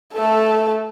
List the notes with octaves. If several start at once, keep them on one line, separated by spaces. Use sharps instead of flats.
A3 A4